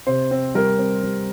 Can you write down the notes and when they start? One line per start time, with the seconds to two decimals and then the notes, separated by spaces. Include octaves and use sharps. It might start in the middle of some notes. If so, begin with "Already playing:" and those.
0.07 C3 C5
0.31 C4
0.55 G3 A#4
0.78 C4
1.03 G3